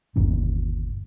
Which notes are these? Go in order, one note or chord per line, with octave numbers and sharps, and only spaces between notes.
G1 D#2 A#2 C#4